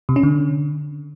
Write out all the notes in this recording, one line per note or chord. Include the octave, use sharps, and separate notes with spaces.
C3
C#4
D3